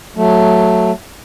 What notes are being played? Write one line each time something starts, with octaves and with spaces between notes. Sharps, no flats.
F#3 A3